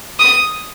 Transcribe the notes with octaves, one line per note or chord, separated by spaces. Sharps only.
D#6